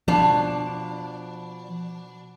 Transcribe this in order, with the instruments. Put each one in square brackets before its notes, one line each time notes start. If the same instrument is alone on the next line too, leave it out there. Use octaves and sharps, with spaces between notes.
[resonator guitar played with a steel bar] B2 D4 [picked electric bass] F3